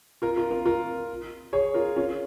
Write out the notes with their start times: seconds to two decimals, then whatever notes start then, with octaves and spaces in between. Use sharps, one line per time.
0.22 F4 A#4
0.36 F4 A#4
0.51 F4 A#4
0.66 F4 A#4
1.53 G#4 C#5
1.74 F4 A#4
1.96 C#4 F4